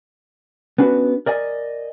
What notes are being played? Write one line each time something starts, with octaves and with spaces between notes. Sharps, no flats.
B3 C#4 D4 F4 F#4 B4
A#4 D5 D#5 G#5